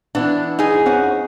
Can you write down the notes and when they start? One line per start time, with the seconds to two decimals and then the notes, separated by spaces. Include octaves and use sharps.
0.15 E3 B3 D4 E4
0.59 D#4 G#4
0.86 F2 C#4 F#5